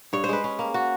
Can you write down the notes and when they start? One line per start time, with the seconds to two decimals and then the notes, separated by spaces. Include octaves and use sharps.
0.13 G2 C#5
0.24 C5
0.29 G#3 B4
0.44 C#4
0.59 A#3
0.74 F#4